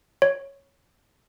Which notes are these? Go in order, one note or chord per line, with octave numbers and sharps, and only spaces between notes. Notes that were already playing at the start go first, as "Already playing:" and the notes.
C#5